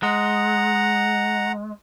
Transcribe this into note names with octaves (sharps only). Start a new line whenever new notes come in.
G#3 F#5 A#5